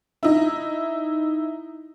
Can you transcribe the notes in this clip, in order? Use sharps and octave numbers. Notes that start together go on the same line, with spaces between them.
D#4 E4